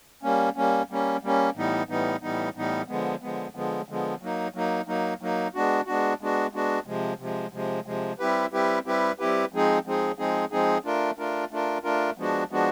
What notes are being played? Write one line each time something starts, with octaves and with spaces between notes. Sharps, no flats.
G3 A#3 C#4
G3 A#3 C#4
G3 A#3 C#4
G3 A#3 C#4
A2 E3 G3 B3 D#4
A2 E3 G3 B3 D#4
A2 E3 G3 B3 D#4
A2 E3 G3 B3 D#4
D3 F3 G#3 B3
D3 F3 G#3 B3
D3 F3 G#3 B3
D3 F3 G#3 B3
F#3 A#3 D#4
F#3 A#3 D#4
F#3 A#3 D#4
F#3 A#3 D#4
G#3 B3 D4 F#4
G#3 B3 D4 F#4
G#3 B3 D4 F#4
G#3 B3 D4 F#4
C3 F3 G#3
C3 F3 G#3
C3 F3 G#3
C3 F3 G#3
G3 C4 E4 G4 B4
G3 C4 E4 G4 B4
G3 C4 E4 G4 B4
G3 C4 E4 G4 B4
F3 G#3 C4 D#4 G#4
F3 G#3 C4 D#4 G#4
F3 G#3 C4 D#4 G#4
F3 G#3 C4 D#4 G#4
A3 D4 F4 A#4
A3 D4 F4 A#4
A3 D4 F4 A#4
A3 D4 F4 A#4
F3 G#3 B3 D4 F#4
F3 G#3 B3 D4 F#4